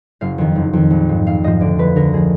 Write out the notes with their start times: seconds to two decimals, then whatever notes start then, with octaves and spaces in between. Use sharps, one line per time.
0.21 F#1 F5
0.38 F2 D#3
0.56 F#1
0.73 F2 D#3
0.90 A#1
1.09 G#2 F3
1.26 A#1 F5
1.44 G#2 F3 D#5
1.60 D2 D5
1.79 D3 F3 B4
1.96 D2 A#4
2.13 D3 F3 G#4